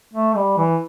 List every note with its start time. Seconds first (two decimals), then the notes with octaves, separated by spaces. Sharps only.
0.13 A3
0.36 G3
0.58 E3